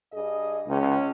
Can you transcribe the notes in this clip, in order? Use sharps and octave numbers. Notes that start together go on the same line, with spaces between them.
G2 G#4 D#5
C#2 C#4